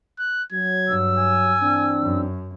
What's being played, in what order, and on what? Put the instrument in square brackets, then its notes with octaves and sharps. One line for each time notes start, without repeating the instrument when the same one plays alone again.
[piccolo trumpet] F#6
[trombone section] F#3 [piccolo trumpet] G#6
[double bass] G2 [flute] E6
[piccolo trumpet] G#5
[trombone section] E3 C4 D4
[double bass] F#2